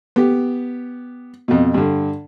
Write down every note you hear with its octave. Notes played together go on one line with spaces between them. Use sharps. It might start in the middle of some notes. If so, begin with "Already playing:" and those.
B3 G4
F2 B2
G2 D3